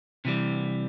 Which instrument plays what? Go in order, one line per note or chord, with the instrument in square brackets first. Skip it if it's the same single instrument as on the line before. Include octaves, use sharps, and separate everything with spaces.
[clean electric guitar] C3 E3 G3